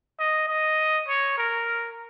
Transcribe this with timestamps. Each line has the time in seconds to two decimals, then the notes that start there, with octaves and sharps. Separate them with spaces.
0.19 D#5
0.48 D#5
1.08 C#5
1.37 A#4